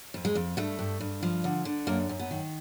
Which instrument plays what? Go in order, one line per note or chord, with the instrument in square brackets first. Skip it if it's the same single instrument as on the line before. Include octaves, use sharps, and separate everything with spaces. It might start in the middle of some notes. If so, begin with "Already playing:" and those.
[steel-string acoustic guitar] F2
G#3
F2
G2 A3
G2
G2
F3
D3
D3
F#2 A#3
F#2
B3
D#3